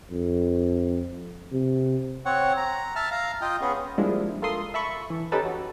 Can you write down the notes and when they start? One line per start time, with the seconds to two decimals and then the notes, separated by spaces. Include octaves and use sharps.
0.11 F2
1.52 C3
2.26 C4 C#5 F#5
2.57 A#5
2.96 E5 A5 F6
3.12 F5 A#5
3.42 F4 D#5 G5
3.61 B3 C#4 G#4
3.98 F3 G3 G#3 A#3 D4 E4
4.42 F4 A4 A#4 C6 D#6
4.74 E5 A5 B5 C#6
5.10 E3
5.32 C#4 D#4 G4 A4 B4 A5
5.45 F#4